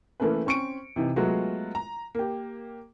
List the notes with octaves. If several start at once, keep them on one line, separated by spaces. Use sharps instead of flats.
E3 A3 A#3 C#4 A4 B4
C4 C#4 C#6 C#7 D7
C3 E3 D#4
F#3 G#3 A3 B3 F4 F#4
A#5
A#3 G4